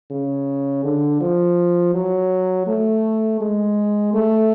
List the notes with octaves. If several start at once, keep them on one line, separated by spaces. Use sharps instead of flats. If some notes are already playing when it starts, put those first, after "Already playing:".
C#3
D3
F3
F#3
A3
G#3
A3